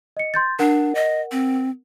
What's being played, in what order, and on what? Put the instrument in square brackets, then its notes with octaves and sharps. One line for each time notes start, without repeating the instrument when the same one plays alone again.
[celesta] D#5 C#7
C6 G6 A6
[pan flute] D4 [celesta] A#4 F#5
[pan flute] D#5
C4